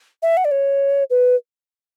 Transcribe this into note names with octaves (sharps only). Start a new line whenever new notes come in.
E5
F#5
D5
C#5
B4